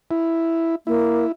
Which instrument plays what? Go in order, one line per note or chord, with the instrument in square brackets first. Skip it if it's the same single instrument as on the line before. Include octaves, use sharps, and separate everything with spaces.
[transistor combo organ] E4
[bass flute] A#3 [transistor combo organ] E4